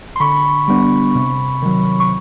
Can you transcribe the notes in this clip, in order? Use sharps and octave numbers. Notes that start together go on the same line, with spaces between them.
C6
D3 B5 C#6
G3 B3 D4
C3
D#3 F#3
C#6